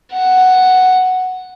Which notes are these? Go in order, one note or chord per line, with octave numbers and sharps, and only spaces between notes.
F#5